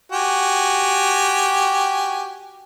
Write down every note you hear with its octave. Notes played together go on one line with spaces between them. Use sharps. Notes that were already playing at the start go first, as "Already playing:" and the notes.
F#4 G4 G#5